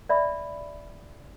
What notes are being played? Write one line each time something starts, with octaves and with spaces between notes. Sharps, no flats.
D5 E5 B5